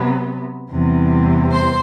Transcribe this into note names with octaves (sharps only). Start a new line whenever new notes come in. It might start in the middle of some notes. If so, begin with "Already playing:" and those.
Already playing: C3 F#3 B3
E2 C3 E3 G3 C4
C5 C6